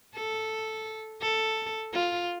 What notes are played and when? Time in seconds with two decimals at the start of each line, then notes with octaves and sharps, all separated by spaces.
0.16 A4
1.21 A4
1.93 F4